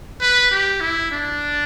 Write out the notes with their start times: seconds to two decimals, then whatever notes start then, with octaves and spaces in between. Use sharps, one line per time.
0.21 B4
0.51 G4
0.81 E4
1.12 D4